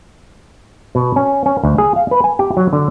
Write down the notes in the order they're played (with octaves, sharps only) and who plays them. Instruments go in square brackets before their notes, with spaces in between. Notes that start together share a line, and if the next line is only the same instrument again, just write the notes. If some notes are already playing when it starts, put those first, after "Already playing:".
[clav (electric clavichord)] B2
C#4
C#4
D2
G#4
F5
B4
G#5
G4
F#3
D3